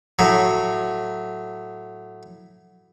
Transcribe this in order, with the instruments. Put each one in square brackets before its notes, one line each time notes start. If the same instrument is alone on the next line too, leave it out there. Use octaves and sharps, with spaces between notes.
[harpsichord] A2 F#3